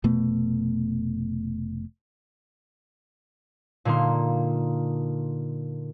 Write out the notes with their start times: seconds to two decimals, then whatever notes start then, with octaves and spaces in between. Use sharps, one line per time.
0.04 F1 B2 A3 B3
3.85 A#2 D3 A#3 D#4 C6